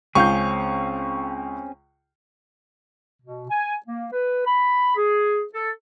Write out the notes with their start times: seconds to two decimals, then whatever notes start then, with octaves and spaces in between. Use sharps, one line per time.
0.15 C#2 C4 C#4 G#4 F5 C#6 G6
3.22 B2
3.49 G#5
3.86 A#3
4.12 B4
4.46 B5
4.96 G#4
5.53 A4